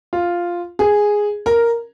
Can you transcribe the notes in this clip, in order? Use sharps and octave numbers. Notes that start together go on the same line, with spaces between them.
F4
G#4
A#4